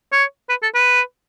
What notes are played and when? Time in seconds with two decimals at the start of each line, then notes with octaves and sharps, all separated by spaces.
0.12 C#5
0.49 B4
0.63 A4
0.75 B4